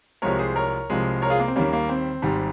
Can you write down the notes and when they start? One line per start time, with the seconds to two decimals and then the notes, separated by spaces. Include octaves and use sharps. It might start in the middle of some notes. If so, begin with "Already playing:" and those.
0.22 C2 C3 F3 G#3 A#4 C#5
0.39 G#4 C5
0.56 A#4 C#5
0.90 C2 C3 F3 G#3
1.22 A#4 C#5
1.30 F4 G#4
1.40 A#3
1.48 C4
1.56 D#2 D#3 G3 A#3 C#4
1.73 A#3
1.89 C4
2.22 G#1 G#2 G3